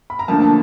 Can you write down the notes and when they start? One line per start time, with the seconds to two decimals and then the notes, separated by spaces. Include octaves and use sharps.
0.10 B5
0.19 A#5
0.28 D2 D3 F3 A#3 A5
0.42 A5